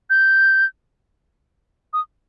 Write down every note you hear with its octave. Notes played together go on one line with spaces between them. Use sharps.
G6
D#6